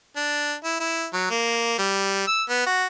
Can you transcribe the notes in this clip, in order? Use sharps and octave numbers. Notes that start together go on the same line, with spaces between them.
D4
E4
E4
F#3
A#3
G3
E6
B3
F#4